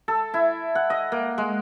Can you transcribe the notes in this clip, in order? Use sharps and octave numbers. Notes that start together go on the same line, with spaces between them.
A4
E4
F#5
D#5
A#3
G#3